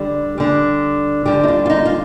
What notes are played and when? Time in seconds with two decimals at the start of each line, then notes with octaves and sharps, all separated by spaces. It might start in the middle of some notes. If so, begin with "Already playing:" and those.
Already playing: D3 G3
0.38 D3 G3
1.25 D3 G3 G4
1.43 D#4
1.48 F4
1.66 F4
1.70 D#4
1.85 F4